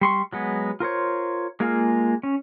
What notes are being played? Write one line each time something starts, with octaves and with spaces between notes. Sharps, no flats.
G3 C6 C#6
F#3 G#3 B3
F4 A#4 C5 C#5
G#3 A#3 F4 G#4 F5
C#4